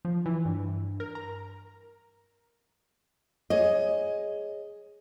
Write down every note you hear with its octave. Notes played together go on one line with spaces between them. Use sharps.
F3
E3
G2
A#4
A#5
G#4 C#5 D#5